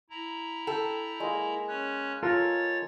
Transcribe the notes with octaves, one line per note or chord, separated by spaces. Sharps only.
E4 A#5
A4 G5
G#3 A#3
C#4 C#5 F#6
F4 A4 A#4 C#5 A6